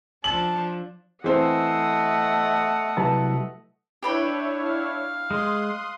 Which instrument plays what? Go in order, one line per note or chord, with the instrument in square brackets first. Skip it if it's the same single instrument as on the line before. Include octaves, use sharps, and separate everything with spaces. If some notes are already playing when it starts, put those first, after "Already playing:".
[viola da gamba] F3 D4 [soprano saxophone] A5 [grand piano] F#7
[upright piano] E3 C4 [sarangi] A3 [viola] D#5 F#5
[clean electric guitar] C2 F#3 A5 [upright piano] B4
[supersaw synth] D4 E4 C#5 [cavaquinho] G4 B4 G5
[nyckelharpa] F5
[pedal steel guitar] G#3 [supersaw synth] C6 D#6 F#6